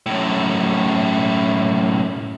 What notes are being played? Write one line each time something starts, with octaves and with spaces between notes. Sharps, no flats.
F#2 A2